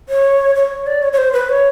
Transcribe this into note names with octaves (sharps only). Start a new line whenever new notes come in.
C#5
C#5
D5
C#5
C#5
C5
B4
C#5